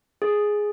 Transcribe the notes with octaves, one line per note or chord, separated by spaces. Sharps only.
G#4